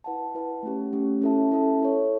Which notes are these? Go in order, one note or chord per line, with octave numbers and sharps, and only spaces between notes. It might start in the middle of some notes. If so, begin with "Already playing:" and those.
E4 B4 F#5 A5
E4 B4 F#5 A5
A3 C#4 G4
A3 C#4 G4
C#4 E4 A4 E5 A5
C#4 E4 A4 E5 A5
E4 A4 C#5